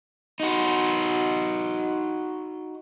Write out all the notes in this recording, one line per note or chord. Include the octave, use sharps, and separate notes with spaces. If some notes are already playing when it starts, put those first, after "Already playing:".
D#4 F#4